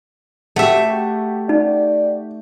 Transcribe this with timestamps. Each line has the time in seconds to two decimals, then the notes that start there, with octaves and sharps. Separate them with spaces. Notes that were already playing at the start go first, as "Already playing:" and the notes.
0.56 A3 F#4 G4 E5
1.49 D#4 D5